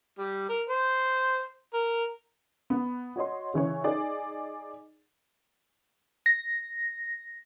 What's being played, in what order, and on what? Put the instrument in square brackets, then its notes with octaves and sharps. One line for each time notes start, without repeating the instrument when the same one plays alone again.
[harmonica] G3
A#4
C5
A#4
[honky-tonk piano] B3
F#4 C#5 D#5 C6
C#3 E3 C#5 C#6
D#4 G#4 D5
[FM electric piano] A#6